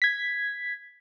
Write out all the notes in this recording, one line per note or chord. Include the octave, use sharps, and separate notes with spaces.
G#6 B6